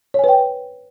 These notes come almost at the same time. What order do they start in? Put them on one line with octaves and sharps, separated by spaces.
C#5 G#5 B4 G5